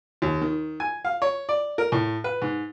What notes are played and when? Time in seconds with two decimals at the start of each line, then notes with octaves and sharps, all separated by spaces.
0.22 D#2
0.41 D#3
0.80 G#5
1.05 F5
1.22 C#5
1.49 D5
1.78 A#4
1.92 A2
2.24 B4
2.42 G#2